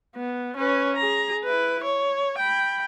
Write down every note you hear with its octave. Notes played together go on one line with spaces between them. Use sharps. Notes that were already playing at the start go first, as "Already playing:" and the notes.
B3
C#4 B4
G#4 A#5
E4 B4
C#5
G5 B5